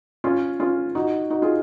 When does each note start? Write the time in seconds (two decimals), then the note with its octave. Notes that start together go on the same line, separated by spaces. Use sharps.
0.24 C#4 F4
0.60 C#4 F4
0.95 D#4 F#4
1.30 D#4 F#4
1.42 F4 G#4